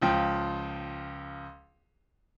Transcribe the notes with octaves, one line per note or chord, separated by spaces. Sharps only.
C#2 F3 G5